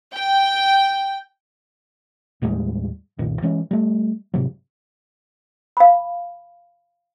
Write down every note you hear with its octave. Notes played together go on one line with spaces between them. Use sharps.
G5
D#2 A2 G3 G#3
C2 F#2 A#2 D#3
E3 G#3 C#4
G3 A3
G#2 C3 F#3
F5 B5